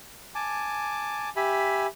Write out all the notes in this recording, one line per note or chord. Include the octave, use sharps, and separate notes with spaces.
G#5 A5 D6
G4 E5 G#5 B5